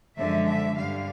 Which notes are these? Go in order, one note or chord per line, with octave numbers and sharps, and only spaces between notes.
F#2 D3 F3 G#3 E5
E5
G2 D3 G3 F5